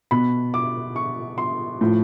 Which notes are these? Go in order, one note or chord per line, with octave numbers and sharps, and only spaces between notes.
B2 B5
D6
C#6
C6
A2 F3